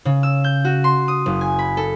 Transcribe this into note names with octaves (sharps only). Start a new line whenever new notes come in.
C#3
E6
G6
F#4
C6
D#6
F#1
G#5
B5
A4